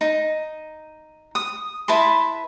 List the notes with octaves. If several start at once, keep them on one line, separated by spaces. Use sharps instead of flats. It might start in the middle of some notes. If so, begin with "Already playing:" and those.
D#4
D#6
E4 B4 A5 C6